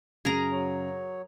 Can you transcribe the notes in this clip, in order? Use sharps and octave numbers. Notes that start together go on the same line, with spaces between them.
F#2 C#3 G#4 A#4 A#5 F7
F#3 C#5